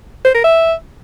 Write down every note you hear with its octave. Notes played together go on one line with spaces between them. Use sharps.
C5
A#4
E5